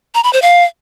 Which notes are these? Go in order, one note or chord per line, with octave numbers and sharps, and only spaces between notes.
A#5
B5
C5
F5